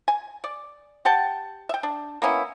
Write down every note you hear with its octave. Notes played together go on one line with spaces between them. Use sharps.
G#5
D5
G4 F#5 G5 A5
E5 G5
D4
A#3 B3 C#4 E4